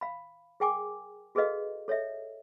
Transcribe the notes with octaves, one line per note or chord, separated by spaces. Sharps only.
F5 B5
G#4 A#4 G5 G#5 D6
F#4 G#4 A4 B4 D#5 F5
A4 C#5 D#5 E5